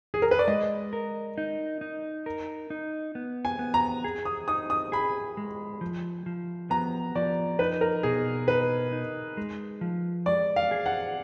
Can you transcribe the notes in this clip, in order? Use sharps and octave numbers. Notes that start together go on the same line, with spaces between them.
G#4
A#4
B4
D5
G#3 D#5
A#4
D#4
D#4
A#4
D#4
B3
G#5
B3
A#5
G#4
D#6
D#4 D#6
D#6
G#4 B5
G#3
F3
F3
B3 A#5
F3 D5
D#4 B4
A#4
B2 G#4
D#4 B4
D#4
G#3
F3
G#3 D5
F5
G#4
F#5